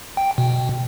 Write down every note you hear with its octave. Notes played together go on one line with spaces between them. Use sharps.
G5
B2